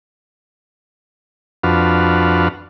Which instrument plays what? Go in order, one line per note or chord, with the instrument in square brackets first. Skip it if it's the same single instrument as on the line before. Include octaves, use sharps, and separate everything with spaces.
[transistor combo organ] F2 D4 F#4 B4 F5